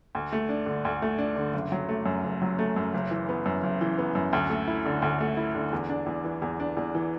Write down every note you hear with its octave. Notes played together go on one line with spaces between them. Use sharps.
D2
A3
D4
D3
D2
A3
D4
D3
F#1
F#3
A3
F#2
F#1
F#3
A3
F#2
F#1
E3
B3
F#2
F#1
E3
B3
F#2
D2
A3
E4
D3
D2
A3
E4
D3
E2
D4
E2
E3
E2
D4
E2
E3